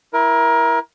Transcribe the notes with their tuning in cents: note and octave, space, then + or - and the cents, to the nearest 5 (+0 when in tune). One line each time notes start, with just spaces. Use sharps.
E4 +0 A#4 +25